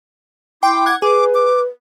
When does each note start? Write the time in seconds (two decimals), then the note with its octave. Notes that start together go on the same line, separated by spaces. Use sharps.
0.63 E4 G5 C6 D6
0.86 F#5 G#6
1.02 G#4 B4 D6
1.35 D6